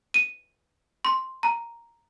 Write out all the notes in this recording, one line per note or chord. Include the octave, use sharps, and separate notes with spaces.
D#7
C6
A#5